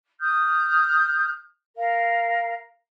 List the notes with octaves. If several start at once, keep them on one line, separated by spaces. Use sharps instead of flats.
D#6 F6 G6
A#4 F5